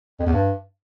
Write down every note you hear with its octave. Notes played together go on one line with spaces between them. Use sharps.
F2
E2
G2